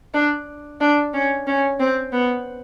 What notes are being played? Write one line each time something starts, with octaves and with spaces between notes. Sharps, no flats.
D4
D4
C#4
C#4
C4
B3